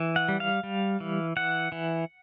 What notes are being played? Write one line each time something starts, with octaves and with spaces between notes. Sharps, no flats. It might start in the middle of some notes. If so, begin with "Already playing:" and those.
Already playing: E3
F#5
G3
F5
G3
E3
E3 F#5
E3